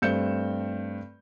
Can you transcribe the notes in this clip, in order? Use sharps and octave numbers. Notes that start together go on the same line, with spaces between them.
G2 A3 C4 G6 C#7 E7